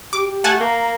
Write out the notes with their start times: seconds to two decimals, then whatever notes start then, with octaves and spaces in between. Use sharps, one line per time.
0.13 G4 D6
0.26 G4
0.44 A3 F#5 G#5 A5
0.60 A#3 A#5